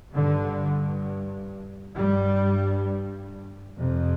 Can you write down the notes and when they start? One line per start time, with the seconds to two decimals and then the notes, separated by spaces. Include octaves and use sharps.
0.12 G2 D3
1.95 G2 G3
3.77 F2 C3